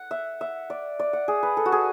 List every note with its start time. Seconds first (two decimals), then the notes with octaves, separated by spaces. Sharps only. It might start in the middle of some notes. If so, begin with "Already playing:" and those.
Already playing: F#5
0.11 E5
0.41 E5
0.70 D5
0.99 D5
1.13 F#5
1.28 G#4
1.43 B4
1.57 A4
1.66 F#4
1.72 G#4